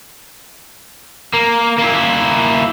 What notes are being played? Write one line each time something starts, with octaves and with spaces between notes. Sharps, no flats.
A#3
A#3 E4